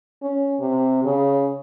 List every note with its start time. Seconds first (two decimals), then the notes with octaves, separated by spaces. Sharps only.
0.23 C#4
0.60 C3
1.05 C#3